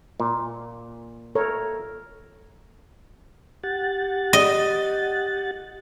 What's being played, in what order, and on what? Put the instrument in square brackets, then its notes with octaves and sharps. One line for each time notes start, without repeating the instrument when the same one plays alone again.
[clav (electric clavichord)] A#2
[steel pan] A4 A#4 C#5
[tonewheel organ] G4 F#5 A6
[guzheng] D#5